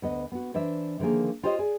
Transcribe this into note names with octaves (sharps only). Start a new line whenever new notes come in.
D2 B3 D#5
B3 F#4
E3 D4 C5 E5
A2 D3 D#3 F3 A#3 G#4
F4 G4 C5 C#5 D#5
G#4 D5